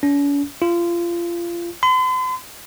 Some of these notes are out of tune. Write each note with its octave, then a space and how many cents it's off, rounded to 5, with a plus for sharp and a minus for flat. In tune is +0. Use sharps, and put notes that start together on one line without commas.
C#4 +45
F4 -25
C6 -45